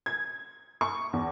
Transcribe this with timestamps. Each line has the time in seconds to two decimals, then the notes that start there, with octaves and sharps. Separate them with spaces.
0.06 G#6
0.81 C#6
1.13 E2